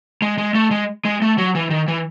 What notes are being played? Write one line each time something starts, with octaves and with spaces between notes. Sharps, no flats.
G#3
G#3
A3
G#3
G#3
A3
F#3
E3
D#3
E3